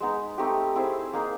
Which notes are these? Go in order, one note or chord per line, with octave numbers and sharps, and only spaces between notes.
G#3 B3 D#4
A3 C4 D#4 G4
C4 E4 G#4 C5
A#3 D#4 G#4